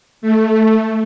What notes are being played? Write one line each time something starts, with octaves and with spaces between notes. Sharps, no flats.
A3